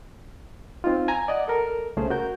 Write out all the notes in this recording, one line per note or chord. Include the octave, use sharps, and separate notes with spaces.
C4 D#4 F4
G#5 A#5
D5 D#5 F#5
A4 A#4
C2 C#3 A3 C#4 G#4 C5
F#4 A#4 G6